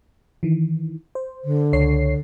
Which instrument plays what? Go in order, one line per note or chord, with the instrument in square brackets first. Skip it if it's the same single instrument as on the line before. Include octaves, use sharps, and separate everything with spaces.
[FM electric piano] D#3 E3
C5
[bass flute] D3
[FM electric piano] C#2 C#5 C7